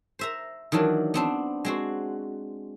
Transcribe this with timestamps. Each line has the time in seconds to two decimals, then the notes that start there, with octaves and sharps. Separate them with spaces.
0.19 C5 E5 A#5
0.72 D#3 E3 F#3 D4
1.14 B3 C4 D4
1.65 G#3 C4 F#4